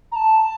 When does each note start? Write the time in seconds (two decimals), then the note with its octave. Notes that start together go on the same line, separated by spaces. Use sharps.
0.12 A#5
0.16 A5